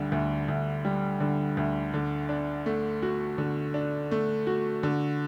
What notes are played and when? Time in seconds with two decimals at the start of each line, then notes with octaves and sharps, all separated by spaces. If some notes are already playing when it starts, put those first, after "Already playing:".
Already playing: D2 D3 G3
0.12 D2
0.48 D2
0.85 G3
1.20 D3
1.57 D2
1.94 D3
2.29 D4
2.66 A3
3.02 F#4
3.38 D3
3.74 D4
4.11 A3
4.47 F#4
4.83 D3